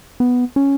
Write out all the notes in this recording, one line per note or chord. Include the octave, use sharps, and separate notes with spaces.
B3
C#4